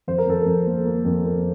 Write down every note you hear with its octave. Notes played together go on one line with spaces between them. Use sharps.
F2 C5
A#4
F2 A4
F2 A#4
A#3
A#3
F2
A#3